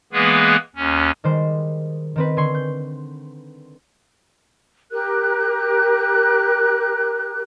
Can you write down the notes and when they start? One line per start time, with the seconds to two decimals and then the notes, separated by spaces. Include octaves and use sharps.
0.13 E3 G#3 A#3 B3 G#4 B4
0.76 D#2 C#4
1.24 D#3 G3 G#3 C5
2.16 D#3 C4 B4
2.37 D3 G#5 C6 C#6
2.55 G6
4.92 G4 A#4 F#6